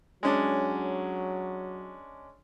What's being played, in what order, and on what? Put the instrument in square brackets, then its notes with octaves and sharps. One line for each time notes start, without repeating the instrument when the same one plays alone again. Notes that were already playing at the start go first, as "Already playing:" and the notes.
[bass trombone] F#3 [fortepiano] G#3 C#4 D4